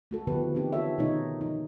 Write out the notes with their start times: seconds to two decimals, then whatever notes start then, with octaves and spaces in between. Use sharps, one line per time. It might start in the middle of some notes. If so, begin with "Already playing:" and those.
0.11 A3 F#4 A4
0.27 D3 D#3 F3 B3 G4 B4
0.55 E3 C4 D#4 G4
0.73 F4 F#4 A4 C#5 E5
0.98 B2 D#3 A3 D#4 C#5
1.41 F3 D#4